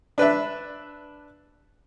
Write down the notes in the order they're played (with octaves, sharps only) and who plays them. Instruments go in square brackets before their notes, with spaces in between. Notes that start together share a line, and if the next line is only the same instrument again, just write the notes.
[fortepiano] D4 B4 D5 E5